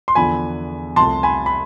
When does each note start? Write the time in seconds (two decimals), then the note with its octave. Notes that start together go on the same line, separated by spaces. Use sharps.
0.08 C6
0.15 E2 D3 F3 G#5 B5
0.96 C2 C3 F3 A3 A5 C6
1.23 G#5 B5
1.46 B5